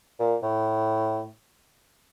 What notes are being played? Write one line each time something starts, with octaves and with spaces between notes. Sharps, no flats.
A#2
A2